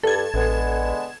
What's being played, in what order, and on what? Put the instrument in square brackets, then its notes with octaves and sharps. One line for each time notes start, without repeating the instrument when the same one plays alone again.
[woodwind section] G2 [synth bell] A4 G#6
[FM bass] A1 [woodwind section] D3 G#3 B3